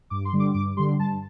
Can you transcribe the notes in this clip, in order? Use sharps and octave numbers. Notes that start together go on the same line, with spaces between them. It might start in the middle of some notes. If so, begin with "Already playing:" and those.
G2 D6
C6
D3 G3
D6
G2 D6
D3 G3 C6
G2 A5